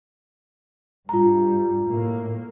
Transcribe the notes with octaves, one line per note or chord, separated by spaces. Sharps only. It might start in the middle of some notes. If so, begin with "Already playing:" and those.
G2 G3 F4 A#5
A2 A#3